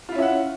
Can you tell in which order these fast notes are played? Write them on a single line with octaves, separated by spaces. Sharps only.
F4 E4 C#4 E5 F#5